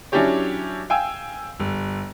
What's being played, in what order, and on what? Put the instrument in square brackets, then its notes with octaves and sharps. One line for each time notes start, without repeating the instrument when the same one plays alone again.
[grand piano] F#3 C#4 D4 E4 G4 C#5
F5 G5 G#5 E6
G1